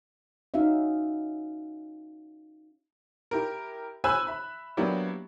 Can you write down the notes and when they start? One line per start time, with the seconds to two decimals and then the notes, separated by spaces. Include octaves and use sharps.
0.54 C#4 D#4 F#4 E5 F5
3.31 E4 G4 A#4
4.04 C5 G#5 B5 E6 F#6
4.27 E5 B5
4.77 F#3 A#3 B3 D4 E4 G4